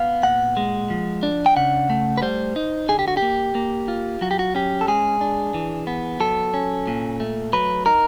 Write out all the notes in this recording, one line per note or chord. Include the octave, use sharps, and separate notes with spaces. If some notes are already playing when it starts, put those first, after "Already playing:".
Already playing: B3 F5
A#2 F#5
G#3
F3
D4
G5
C#3 F#5
A3
B4
G3 C5
D#4
D3 G#4
G4
F#4
G4
A#3
A#3
F4
F#3 F#4
G4
F#4
C#4 G4
A4
G#3 G#4
D4
E3
B3
F#3 A4
C#4
A#2
A3
F#3 B4
D#4 A#4